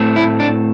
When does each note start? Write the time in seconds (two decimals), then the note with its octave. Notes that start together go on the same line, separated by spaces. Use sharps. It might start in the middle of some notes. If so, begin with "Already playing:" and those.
Already playing: A2 A3 C4
0.16 E4
0.40 D4